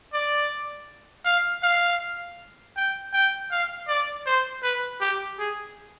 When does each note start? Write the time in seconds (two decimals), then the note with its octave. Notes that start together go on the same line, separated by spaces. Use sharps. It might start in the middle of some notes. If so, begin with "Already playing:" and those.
0.14 D5
1.25 F5
1.63 F5
2.76 G5
3.13 G5
3.51 F5
3.88 D5
4.26 C5
4.63 B4
5.01 G4
5.39 G#4